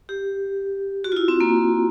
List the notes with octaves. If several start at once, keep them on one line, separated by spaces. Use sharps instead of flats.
G4
F#4
F4
E4
C4
A#3